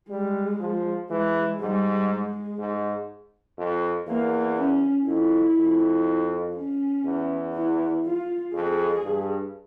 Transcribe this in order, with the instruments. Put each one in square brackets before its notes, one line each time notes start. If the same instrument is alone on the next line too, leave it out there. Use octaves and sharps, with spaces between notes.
[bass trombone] G3 [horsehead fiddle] G#3
[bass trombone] F3
[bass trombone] E3 [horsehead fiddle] G#3
[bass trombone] G#2 [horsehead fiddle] G3
[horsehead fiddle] G#3
[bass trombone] G#2
F2
[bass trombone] E2 [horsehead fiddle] A#3
[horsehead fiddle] C#4
[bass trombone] F2 [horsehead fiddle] E4
[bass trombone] F2
[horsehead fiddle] C#4
[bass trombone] E2
[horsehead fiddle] E4
F4
[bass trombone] F2 [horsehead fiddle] G#4
[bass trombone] G2